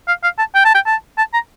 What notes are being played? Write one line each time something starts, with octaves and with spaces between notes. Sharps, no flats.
F5
F5
A5
G5
A5
G5
A5
A5
A#5